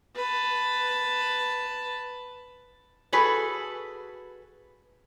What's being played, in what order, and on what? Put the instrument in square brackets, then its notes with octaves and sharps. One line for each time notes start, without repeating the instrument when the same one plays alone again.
[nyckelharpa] B4 A5
[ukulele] F#4 G#4 A4 B4